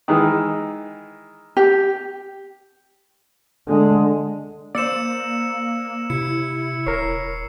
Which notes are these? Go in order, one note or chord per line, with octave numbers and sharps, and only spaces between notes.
D#3 E3 G#3
G4
D3 G#3
A#3 C5 D5 E6 C#7 E7
C3 E4 C#7
D#1 A#4 C#5 C7